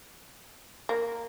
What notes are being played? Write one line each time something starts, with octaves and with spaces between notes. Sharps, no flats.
A#3